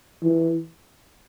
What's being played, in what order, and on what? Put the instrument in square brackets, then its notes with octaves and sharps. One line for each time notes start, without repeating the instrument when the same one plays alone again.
[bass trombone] E3